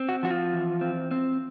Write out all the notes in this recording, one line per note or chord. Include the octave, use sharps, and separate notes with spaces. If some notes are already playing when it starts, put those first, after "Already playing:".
Already playing: C4
F#4
F3 F#4
F4
E3
C4
C4